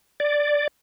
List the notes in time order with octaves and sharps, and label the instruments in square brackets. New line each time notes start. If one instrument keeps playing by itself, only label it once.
[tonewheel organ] D5